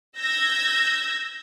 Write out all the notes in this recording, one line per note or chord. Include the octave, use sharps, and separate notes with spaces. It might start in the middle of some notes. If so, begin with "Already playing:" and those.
E6 G6 G#6 A#6